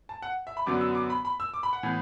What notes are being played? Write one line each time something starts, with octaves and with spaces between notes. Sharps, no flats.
A5
F#5
E5
B5
F#2 D3 F#3 B3 D6
E6
D6
B5
B5
E6
D6
B5
F#5
A2 E3 B3